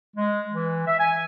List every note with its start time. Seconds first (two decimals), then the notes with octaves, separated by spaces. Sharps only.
0.17 G#3
0.52 E3
0.87 E5
0.99 G#5